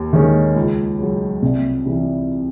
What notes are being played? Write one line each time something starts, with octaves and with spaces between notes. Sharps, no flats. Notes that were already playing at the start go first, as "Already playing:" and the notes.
Already playing: D#2
D#3 G#3 C#4
C#2
C#3 F#3
C2
C3 E3